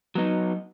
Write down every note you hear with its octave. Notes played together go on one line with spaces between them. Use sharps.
F#3 B3 D#4